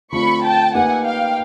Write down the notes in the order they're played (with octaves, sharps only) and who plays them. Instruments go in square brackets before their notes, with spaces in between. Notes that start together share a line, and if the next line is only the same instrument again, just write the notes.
[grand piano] D3 F3 A3 C4 F4 [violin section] B5 C#6
[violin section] G5 A5
[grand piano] A#3 D#4 G4 B4 [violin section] F#5 G#5
[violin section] F5 G5